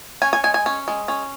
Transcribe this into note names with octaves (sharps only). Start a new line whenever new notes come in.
C#4 G#5
G#5
G#3 G#5
G#5
C#4
G#3
C#4